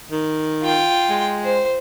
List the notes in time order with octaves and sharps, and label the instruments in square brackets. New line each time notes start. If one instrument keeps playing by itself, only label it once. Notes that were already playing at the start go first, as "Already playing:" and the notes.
[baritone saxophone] D#3
[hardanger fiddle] F4 G5
[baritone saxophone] G#3
[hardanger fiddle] C5